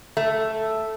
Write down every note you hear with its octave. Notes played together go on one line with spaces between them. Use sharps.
A3